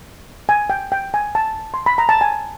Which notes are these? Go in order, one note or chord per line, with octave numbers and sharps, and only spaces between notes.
G#5
G5
G5
G#5
A5
C6
B5
A#5
A5
G#5